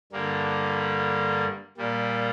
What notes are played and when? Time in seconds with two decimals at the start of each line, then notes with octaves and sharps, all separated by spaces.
0.12 G2 D3 G3 A#3
1.77 A#2 G3 A#3